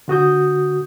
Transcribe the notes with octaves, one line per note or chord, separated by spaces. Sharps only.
D3 F#4 D#6 G6